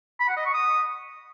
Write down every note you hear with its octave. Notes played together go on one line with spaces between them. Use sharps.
B5
F#5
D#5
C#6
D#6